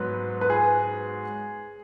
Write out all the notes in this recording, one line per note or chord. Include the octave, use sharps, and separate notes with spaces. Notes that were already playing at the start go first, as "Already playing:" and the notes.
Already playing: G#2 F#3 B3 B4
B4
G#4